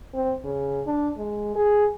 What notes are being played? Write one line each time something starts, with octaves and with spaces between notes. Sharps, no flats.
C4
C#3
D4
G#3
G#4